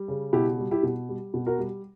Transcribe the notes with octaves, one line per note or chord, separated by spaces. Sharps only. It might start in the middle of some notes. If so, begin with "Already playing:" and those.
Already playing: G3
C#3
B2 E4 G4
G3
E4 G4
B2
G3
B2
F#4 A#4
G3